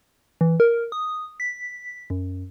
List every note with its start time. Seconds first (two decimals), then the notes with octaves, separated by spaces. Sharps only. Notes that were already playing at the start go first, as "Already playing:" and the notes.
0.41 E3
0.60 A#4
0.92 D#6
1.40 B6
2.10 F#2